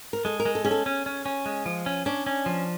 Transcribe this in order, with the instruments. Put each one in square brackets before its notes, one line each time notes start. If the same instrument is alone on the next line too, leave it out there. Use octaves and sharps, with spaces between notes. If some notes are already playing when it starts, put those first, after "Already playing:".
[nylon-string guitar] A#4
[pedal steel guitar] G#3 [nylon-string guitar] A4
[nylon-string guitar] A#4
[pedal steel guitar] G#3
[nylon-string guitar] A4
[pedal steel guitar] C#4 [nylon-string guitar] G#4
[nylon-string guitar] A4
[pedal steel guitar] C#4
C#4
C#4
G#3
F3
C#4
[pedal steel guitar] C#4 [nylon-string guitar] D4
[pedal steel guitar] C#4
F3